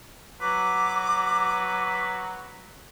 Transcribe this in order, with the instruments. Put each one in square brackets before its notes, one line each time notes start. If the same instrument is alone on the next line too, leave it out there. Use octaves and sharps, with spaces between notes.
[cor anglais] F#3 [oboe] B4 [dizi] D6